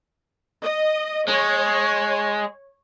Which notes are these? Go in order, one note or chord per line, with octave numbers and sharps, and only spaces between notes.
D#5
G#3 C#5